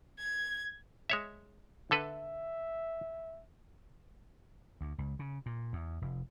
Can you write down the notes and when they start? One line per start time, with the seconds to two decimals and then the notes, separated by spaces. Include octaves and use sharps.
0.18 G#6
1.10 G#3 C#5 E5
1.91 D3 A4 B4 E5
4.81 D2
4.98 C#2
5.19 C#3
5.46 A#2
5.73 E2
6.02 F1